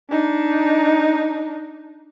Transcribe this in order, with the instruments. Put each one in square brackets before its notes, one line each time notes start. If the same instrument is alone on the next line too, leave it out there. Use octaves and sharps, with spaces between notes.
[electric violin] D4 D#4